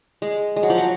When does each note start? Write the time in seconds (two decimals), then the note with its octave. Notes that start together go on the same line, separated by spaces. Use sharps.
0.22 G#3
0.56 G#3
0.63 F#3
0.70 F3
0.78 F#3